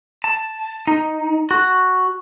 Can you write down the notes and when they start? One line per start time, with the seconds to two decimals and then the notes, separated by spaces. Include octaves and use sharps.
0.24 A5
0.87 D#4
1.51 F#4